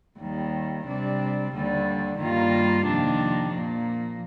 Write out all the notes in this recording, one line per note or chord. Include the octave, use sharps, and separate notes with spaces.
D#2 D#3 G3
C3 G3 D4
D#2 D3 G3
G2 D#3 G3 A#3 F4
F2 C3 D#3 A#3 D4
A#2 F3 A#3